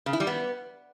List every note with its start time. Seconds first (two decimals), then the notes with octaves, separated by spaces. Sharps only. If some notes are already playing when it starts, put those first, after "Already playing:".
0.06 C#3
0.13 E4
0.20 G3
0.27 B3